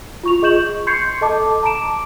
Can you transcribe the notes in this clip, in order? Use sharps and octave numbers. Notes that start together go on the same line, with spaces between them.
F4 C#6 F7
G#4 D#5 C#6 G6 E7 F#7
C6 C#6 G6 G#6 C7 C#7
A4 D#5 A5 D6
A5 A#5 D6 D7 E7